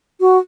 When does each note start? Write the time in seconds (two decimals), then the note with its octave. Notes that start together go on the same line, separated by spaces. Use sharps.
0.20 F#4